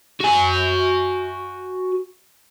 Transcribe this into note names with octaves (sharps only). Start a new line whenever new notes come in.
F#4 G#5